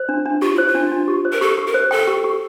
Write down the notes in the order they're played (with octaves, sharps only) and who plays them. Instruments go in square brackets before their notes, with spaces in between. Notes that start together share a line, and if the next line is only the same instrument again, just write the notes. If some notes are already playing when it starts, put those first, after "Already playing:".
Already playing: [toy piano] C5
D4
D4
[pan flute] F4 [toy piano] G4
[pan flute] E4 [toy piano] C5
[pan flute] F4
[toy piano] D4
D4
G4
C5
[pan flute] A#4
[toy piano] G4 [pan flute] A4
[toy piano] G4
[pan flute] A#4
[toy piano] C5
[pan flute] A4 [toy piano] G5
[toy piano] G4
G4